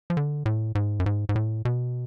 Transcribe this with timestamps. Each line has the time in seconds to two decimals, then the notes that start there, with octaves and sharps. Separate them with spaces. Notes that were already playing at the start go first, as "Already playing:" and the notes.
0.10 F3
0.17 D3
0.46 A2
0.75 G#2
1.00 F#2
1.06 G#2
1.29 G#2
1.36 A2
1.65 B2